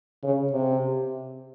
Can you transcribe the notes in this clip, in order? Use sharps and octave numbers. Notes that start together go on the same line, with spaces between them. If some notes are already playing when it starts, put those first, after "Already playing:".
C#3
C3